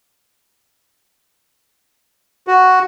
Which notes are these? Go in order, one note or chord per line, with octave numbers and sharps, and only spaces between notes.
F#4